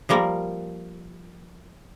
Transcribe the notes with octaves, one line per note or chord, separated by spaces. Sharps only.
F3 G3 A#3 A#4